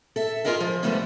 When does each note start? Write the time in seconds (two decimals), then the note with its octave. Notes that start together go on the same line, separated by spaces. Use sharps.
0.16 A4 E5
0.44 F4 F#4 G#4 A#4 D#5 F5
0.60 F3
0.83 D3 F3 G3 A3 B3 C#4